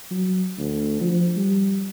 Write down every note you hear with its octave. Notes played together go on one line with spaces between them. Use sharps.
F#3
D2
F3
G3